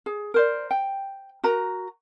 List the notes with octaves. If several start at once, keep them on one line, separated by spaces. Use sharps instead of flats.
G#4
A#4 C5 D5
G5
F#4 A#4 A#5